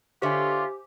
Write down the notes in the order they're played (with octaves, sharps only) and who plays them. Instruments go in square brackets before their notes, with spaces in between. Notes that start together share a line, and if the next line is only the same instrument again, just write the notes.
[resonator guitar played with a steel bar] D3 C#5 [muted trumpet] F4 [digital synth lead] G4 [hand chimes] C5 E5 G#5